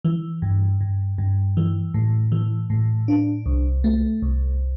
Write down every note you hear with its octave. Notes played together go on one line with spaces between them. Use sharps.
E3
G2
G2
G2
E3
A2
E3
A2
D4
C2
A3
C2